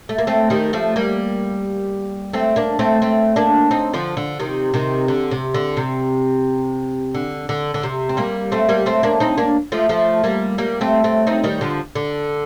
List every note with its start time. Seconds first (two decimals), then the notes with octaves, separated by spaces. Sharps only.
0.09 A3
0.19 A#3
0.27 A3 C4
0.50 D#3 G3
0.73 F3 A3
0.96 G3 A#3
2.33 A3 C4
2.56 A#3 D4
2.79 A3 C4
3.02 A3 C4
3.36 A#3 D4
3.71 C4 D#4
3.93 D3 F3
4.17 D3
4.40 C3 D#3
4.74 C3 D#3
5.08 D3
5.31 C3
5.54 D3
5.77 C3
7.15 D3
7.49 D3
7.74 D3
7.83 C3
8.09 C4
8.17 G3 A#3
8.52 A3 C4
8.69 G3 A#3
8.86 A3 C4
9.03 A#3 D4
9.20 C4 D#4
9.38 A#3 D4
9.72 F3 A3
9.89 F3 A3
10.24 G3 A#3
10.58 G3 A#3
10.81 A3 C4
11.04 A3 C4
11.27 C4 D#4
11.44 D#3 G3
11.61 D3 F3
11.95 D3